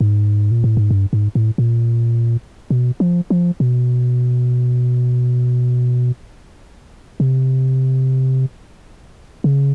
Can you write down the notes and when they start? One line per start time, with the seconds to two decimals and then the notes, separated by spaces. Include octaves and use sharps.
0.01 G#2
0.51 A#2
0.64 A2
0.77 G#2
0.91 G2
1.13 G#2
1.35 A2
1.58 A#2
2.70 B2
3.00 F3
3.30 F3
3.60 B2
7.20 C3
9.44 C#3